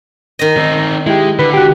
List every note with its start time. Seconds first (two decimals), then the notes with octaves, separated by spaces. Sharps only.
0.39 D#3 D#5
0.57 C4 D#4
1.07 G#3 E4 G4
1.39 D3 B4
1.54 F#4 G4